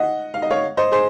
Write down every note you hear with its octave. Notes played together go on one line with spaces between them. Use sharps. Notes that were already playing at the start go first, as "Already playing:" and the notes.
Already playing: D#5 F#5
F5
D#5
C#5 F5
C5 D#5
G#4 C5